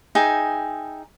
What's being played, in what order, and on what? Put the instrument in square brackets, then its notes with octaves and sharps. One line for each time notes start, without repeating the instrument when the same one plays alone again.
[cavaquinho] D#4 G#4 E5 G5